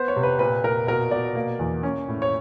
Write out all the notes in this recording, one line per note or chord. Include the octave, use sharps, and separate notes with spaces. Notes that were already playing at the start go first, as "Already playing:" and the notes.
Already playing: B3 C5
C#5
C3
B4
A#2 B4
A#2 A#4
B2 A#4
B2 D5
A#3
E2
C#4
A2
C#5